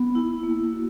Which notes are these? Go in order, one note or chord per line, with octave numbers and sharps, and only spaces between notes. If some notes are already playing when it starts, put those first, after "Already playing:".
Already playing: B3
E4
A#3
F#4